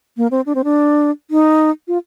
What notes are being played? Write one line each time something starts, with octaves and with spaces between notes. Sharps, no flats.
A#3
C4
D4
C4
D4
D#4
F4